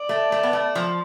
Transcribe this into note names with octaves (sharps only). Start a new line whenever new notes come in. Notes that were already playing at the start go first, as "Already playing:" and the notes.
Already playing: D5
A3
A3
B3
A3
F3